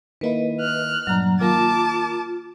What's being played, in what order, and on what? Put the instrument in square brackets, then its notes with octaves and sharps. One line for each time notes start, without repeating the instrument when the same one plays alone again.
[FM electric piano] D#3 A#3 E4 [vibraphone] B4 D#5
[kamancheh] F6 F#6
[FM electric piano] G2 A#2 D4 [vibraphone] F#3 A#5
[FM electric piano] D#3 A#3 A#5 [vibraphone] F4 [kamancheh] A5 D6